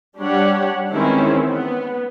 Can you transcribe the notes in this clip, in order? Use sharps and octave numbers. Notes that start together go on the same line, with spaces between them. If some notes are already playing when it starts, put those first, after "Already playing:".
G3 D4 G4 C#5 F#5
D#3 E3 G#3 C4 C#4 E4
B3